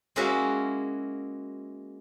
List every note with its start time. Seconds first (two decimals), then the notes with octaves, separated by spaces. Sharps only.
0.16 G#3 A#3 C#4 E4 F#4 E5